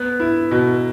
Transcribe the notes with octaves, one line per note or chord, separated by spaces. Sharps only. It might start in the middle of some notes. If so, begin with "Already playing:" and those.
Already playing: B3
E4
B2